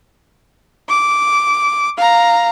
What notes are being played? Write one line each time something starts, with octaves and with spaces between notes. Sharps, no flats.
D6
F5 A#5